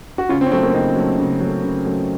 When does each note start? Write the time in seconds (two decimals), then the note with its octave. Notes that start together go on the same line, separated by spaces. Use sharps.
0.18 F#4
0.29 C#3 C#4 F4
0.41 C4
0.46 C#4
0.52 F#3 A3 C4
0.63 A#3 C#4
0.74 C#3 C4 D#4
0.96 F#3 A3
1.19 C#3
1.40 F#3 A3
1.63 C#3
1.85 F#3 A3